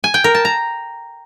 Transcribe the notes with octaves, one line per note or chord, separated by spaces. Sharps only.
G#5
G5
A#4
A5
A#5